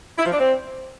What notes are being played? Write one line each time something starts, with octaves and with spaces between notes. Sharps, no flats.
E4
F3
D4
C4